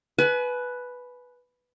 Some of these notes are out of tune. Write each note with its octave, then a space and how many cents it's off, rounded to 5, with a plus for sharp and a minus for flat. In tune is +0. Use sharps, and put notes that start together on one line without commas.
B4 +0 G#5 +40